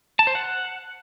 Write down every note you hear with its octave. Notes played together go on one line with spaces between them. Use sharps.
A5
C5
F#5